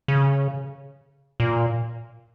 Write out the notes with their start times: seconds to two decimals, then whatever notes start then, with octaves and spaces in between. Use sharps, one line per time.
0.08 C#3
1.40 A#2